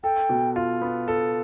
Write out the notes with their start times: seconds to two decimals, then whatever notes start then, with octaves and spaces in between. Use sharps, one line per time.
0.04 A4 G5
0.29 B2
0.56 F4
0.82 B3
1.08 A4